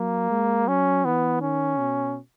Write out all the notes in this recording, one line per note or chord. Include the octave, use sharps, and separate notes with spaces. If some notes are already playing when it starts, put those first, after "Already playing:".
Already playing: F#3 A#3
G#3
F#3 C#4
E3 B3
D#3 C#4
B2